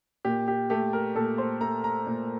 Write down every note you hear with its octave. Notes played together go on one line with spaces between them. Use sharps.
A#2 G4
G4
A3 G4
A#4
A#2 A4
C5
A3 A#5
A#5
A#2